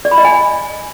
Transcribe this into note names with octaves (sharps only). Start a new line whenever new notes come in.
D5
B5
D#5
G#5